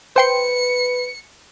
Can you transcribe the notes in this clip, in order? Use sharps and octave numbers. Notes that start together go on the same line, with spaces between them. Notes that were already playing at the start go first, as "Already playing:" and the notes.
B4 C5 G5 C6 C#7